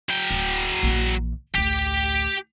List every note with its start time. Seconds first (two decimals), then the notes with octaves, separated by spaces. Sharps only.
0.09 F#3 G5
0.31 D1
0.83 A#1 E3
1.54 A1 D2 G4